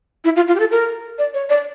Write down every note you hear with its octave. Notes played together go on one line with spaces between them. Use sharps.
E4
F4
F4
G4
A4
A#4
D5
C#5
D5